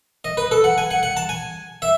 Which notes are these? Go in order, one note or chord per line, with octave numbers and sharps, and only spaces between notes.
D#5
B4
A4
F#5
G#5
F#5
F#5
A5
G#5
E5